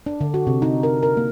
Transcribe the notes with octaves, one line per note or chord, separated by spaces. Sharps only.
D4
D3
F#4
C3
D#4
A#4
A#4
A#3